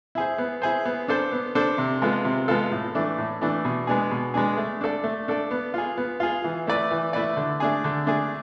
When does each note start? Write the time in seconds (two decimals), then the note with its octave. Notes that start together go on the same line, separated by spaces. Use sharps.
0.15 E4 G#4 C5
0.38 B3
0.62 E4 G#4 C5
0.85 B3
1.08 D4 A4 C5
1.32 B3
1.55 D4 A4 C5
1.78 C3
2.02 G#3 B3 F4 A4
2.25 C3
2.48 G#3 B3 F4 A4
2.72 A2
2.95 E3 A3 D4
3.18 A2
3.41 E3 A3 D4
3.65 B2
3.87 G#3 B3 D4 G#4
4.11 B2
4.34 G#3 B3 D4 G#4
4.57 A3
4.81 D4 A4 D5
5.04 A3
5.28 D4 A4 D5
5.51 B3
5.74 F4 G#4
5.97 B3
6.20 F4 G#4
6.44 E3
6.67 A3 E4 B4 D5
6.91 E3
7.13 A3 E4 B4 D5
7.36 D3
7.60 A3 D4 G#4
7.84 D3
8.07 A3 D4 G#4